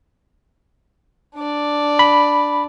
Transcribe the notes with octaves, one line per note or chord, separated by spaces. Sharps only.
D4 D5
B5